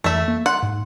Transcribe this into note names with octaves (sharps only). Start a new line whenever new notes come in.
F2 E3 A3 E5
A#3
F#5 C6
G#2